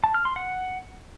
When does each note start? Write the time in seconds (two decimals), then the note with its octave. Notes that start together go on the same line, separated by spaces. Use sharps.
0.04 A5
0.14 F6
0.25 C6
0.36 F#5